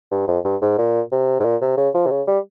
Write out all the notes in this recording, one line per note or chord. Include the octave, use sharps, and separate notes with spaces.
G2
F2
G2
G#2
A#2
C3
G#2
A#2
C3
C#3
F3
C3
C#3
G3